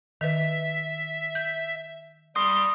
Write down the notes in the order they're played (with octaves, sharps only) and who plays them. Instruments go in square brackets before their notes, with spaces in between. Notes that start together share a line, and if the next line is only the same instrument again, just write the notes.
[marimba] D#3 B4 [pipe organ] E5
[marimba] G6
[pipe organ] G3 [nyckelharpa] C6 [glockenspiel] D#6 A#6